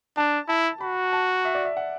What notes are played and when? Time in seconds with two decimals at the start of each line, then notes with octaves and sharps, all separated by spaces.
0.17 D4 A5
0.48 E4 A5
0.81 F#4 B5
1.13 A5
1.45 E5
1.55 D5
1.65 E5
1.77 F#5